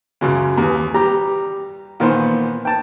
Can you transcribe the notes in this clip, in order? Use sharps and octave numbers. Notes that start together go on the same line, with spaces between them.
C#2 F#2 C#3
D#2 E3
G3 G4 A#5
A#2 D#3 E3 B3 C5
G5 A5